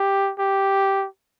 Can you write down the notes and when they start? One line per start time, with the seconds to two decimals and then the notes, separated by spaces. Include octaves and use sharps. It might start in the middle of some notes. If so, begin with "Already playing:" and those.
Already playing: G4
0.39 G4